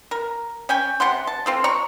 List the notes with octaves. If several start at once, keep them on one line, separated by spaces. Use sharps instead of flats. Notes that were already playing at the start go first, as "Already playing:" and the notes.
A#4
C#4 G5 G#5
C3 F#5 C6
A5
C4 F4 A4
C#5 A#5 C#6